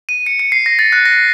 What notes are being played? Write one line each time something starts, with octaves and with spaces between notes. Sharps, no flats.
D#7
C#7
C#7
C7
A#6
A6
F#6
A#6